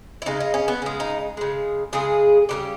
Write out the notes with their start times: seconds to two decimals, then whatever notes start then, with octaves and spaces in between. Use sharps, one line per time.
0.22 E4
0.26 C#3 G#3 D#4
0.40 D#4
0.54 C#4
0.68 B3
0.82 C#3 G#3
1.00 D#4
1.37 C#3 G#3
1.93 C#3 G#3 G#4
2.49 C#3 E3 G3 G4